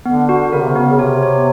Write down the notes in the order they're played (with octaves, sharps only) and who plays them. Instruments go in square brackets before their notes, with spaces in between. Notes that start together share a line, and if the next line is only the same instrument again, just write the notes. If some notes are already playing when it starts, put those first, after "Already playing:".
[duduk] D3 [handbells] B3
[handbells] F#4
[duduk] C#3 [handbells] A#4
[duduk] C3
[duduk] C#3 [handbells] B3
[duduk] C#3
[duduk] C3 [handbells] C#5
[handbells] C#5